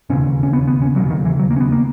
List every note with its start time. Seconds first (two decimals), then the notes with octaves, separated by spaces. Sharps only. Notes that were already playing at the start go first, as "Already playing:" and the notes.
0.10 E1 D#2 C#3 C#4
0.43 C#4
0.53 B3
0.68 B3
0.82 C#4
0.96 E1 D#2 C#3 F#3
1.10 D#3
1.25 E3
1.39 F#3
1.50 A#3
1.56 C#4
1.60 B3
1.72 A#3